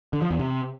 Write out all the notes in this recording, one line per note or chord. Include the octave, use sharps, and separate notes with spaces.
D3
F3
E2
C3